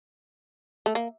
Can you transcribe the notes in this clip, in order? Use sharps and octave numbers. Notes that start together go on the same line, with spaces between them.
A3
A#3